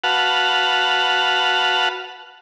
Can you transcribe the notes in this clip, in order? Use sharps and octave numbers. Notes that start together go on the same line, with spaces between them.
F#4 B4 F5 F#5 A5